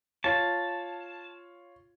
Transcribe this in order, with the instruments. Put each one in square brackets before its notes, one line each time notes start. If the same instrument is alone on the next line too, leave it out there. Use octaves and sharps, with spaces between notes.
[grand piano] F4 C#5 [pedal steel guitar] A5